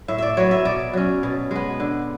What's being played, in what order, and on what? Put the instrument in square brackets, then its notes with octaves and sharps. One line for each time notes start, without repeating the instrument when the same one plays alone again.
[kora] A2 E5
D5 E5
F#3 B3 C#5
E5
B2 D5
F#3 C#4
B2
G#3 B3
D3